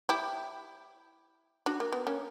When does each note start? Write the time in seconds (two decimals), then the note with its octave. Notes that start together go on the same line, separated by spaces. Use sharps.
0.09 E4 G4
1.66 D4 F#4
1.80 A#3
1.92 B3
2.07 A#3 C#4